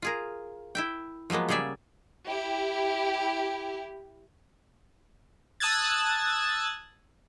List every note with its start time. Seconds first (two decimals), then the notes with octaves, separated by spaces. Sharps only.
0.02 F4 G#4 A#4
0.75 E4 E5 G5
1.30 F3 F#3 G#3 A#3 B3
1.49 C#3 G3 G#4 D5 E5
2.28 E4 G4
5.60 A5 D#6 E6 F#6 G#6 A6